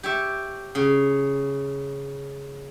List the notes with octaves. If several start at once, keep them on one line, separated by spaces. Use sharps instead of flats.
G4 C#5 E5
C#3